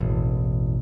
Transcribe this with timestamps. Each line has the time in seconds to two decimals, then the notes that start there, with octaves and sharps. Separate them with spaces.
0.01 E1 A1